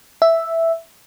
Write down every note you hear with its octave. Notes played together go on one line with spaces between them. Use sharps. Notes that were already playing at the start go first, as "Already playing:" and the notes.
E5